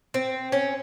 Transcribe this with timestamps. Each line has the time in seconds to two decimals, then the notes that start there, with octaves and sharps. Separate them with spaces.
0.14 C4
0.52 C#4